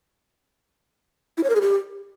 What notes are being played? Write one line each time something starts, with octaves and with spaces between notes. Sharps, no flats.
E4
C#5
A#4
G#4
G4